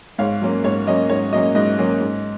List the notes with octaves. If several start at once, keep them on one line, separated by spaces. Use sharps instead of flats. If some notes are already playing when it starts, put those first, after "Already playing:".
G#2 C#5 F5
F#3 A#3 C#4
G#2 C#5
F#3 A#3 C#4 D#5
G#2 C#5
F#3 A#3 C#4 D#5
G#2 D#5
F#3 A#3 C#4
G#2